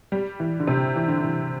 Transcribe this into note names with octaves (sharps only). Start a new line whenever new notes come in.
G3
E3
D3
C3
E3
D3
E3